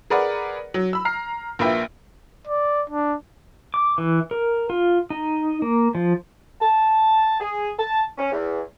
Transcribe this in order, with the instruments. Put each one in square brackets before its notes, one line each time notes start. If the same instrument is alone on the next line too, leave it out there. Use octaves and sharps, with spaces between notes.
[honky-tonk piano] G#4 A#4 B4 D5 F#5
F#3
B5 E6
A#5 F6 C7
A#1 A#3 F4 B4 E5 G5
[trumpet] D5
D4
[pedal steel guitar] D6
E3
A#4
F4
D#4
A#3
F3
[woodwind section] A5
G#4
A5
C#4
E2